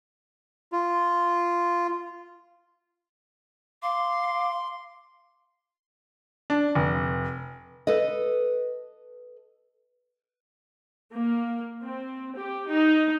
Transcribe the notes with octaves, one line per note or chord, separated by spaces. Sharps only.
F4
F5 C6 D6
D4
F1
A4 B4 D#5
A#3
C4
G4
D#4